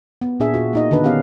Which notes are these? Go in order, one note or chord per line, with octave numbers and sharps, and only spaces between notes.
B3
A#2 D4 G#4 E5
A#2 F4 F#4
A#3 D#4 D#5
D3 D#3 D4 B4
B3 C#4 G4 F5